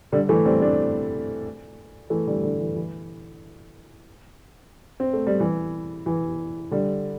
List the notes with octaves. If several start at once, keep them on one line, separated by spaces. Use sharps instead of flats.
D3 G3
E3 A3
G3 C4
A3 D4
E3 A3
D3 G3
D3
E3
E3
C4
A3
G3
E3
E3
D3 G3